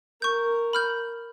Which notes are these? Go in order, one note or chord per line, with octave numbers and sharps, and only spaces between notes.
A#4 C#6 G6
B5 F6 G6